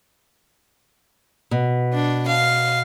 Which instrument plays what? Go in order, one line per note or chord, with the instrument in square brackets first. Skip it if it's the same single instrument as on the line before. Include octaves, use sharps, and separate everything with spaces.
[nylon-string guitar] B2
[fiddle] D4
F5